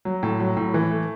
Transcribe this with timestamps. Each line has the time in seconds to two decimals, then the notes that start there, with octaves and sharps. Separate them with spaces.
0.05 F#3
0.23 A2
0.40 F#3
0.57 A2
0.74 E3
0.91 A3